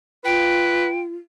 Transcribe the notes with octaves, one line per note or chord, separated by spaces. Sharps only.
F4 B4 G5